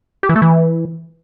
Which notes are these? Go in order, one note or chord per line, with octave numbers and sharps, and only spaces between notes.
G4
E3
A3
E3